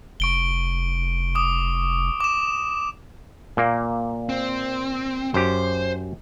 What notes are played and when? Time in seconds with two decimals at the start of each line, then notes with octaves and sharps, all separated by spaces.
0.20 F1 C#6 D7 G7
1.35 D6 D#6
2.20 D6 E7
3.57 A#2 A#3
4.29 C4
5.34 F#2 G4 C5